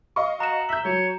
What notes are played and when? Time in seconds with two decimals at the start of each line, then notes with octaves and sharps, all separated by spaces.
0.16 D#5 F5 C#6
0.40 F#4 A#5 E7
0.69 E5 G6 F#7
0.85 F#3 C#5